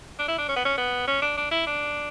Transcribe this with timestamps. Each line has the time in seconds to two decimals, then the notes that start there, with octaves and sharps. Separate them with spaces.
0.19 D4
0.28 E4
0.38 D4
0.48 C#4
0.56 B3
0.65 C#4
0.77 B3
1.07 C#4
1.22 D4
1.37 D4
1.51 E4
1.67 D4